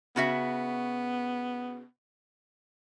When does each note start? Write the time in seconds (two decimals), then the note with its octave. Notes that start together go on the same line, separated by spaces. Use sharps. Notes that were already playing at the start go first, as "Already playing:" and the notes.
0.16 C#3 B3 F#4 E5